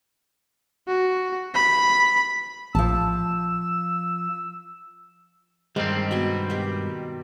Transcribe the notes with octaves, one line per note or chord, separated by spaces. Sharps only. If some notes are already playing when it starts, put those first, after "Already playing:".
F#4
B5
A#1 F3 A5 E6
G2 D#3 G3 G#3 C4 C5
B2 B3 G#5
B3 G4